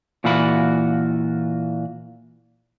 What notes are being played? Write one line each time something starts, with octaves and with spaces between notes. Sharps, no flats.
A#2 E3 F4 F#4 B5